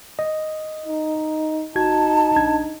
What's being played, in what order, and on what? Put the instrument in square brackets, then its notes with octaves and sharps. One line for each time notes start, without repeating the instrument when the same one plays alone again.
[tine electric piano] D#5
[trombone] D#4
[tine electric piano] G1 F#4 G#6 [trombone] D#4 [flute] A5
[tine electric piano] A#1 D4 G#6